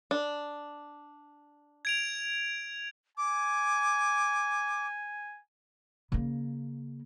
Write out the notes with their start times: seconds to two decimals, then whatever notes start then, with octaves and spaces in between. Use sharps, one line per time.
0.11 D4
1.85 G#6 D7 F7
3.17 G#5 D6
6.12 C#3 A#3